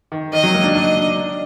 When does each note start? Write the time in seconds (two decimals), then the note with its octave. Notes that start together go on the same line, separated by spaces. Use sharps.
0.12 D#3
0.33 D#3 D#5
0.44 F#3
0.54 A#3
0.64 D4
0.75 D4 D#5
1.17 D4